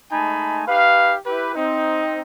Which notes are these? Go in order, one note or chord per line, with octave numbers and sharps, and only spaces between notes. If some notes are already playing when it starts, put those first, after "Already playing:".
G#3 A3 D#4 G#5 A5 B5
D#4 G4 B4 F5
E4 G4 B4
C4 D#4